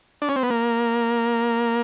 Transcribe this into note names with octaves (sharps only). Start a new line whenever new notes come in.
D4
C#4
C4
B3
A#3